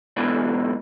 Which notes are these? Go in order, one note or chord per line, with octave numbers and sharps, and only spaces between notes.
G#2 B2 D3 E3